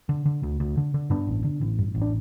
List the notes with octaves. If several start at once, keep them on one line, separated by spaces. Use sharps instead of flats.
D3
D3
D2
D2
D3
D3
G2 B3 D4
A1
D3
A1
G2
A1
D4